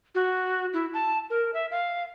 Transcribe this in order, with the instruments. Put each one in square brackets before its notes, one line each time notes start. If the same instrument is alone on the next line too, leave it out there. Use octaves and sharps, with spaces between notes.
[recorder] F#4
E4
A5
A#4
E5
F5